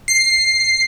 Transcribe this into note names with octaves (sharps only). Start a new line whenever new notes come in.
C7